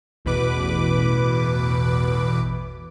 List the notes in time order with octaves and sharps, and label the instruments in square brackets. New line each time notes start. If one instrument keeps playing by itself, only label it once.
[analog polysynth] A1 E2 B2 B4 D6